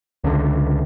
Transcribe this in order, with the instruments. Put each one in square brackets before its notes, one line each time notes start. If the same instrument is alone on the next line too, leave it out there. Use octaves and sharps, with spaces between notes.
[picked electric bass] C#2 D3